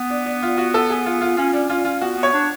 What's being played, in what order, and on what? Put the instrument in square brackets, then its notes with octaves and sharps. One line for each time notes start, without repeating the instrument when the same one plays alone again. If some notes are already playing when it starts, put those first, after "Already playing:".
Already playing: [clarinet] B3
[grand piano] D4
D4
F4
F#4
A4
G#4
F4
F4
[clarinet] C#4 [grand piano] F4
[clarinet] C#4 [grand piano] D4
[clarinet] C#4 [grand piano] F4
[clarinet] C#4 [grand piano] F4
[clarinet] B3 [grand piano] F#4
[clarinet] B3
[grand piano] C#5
[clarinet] D4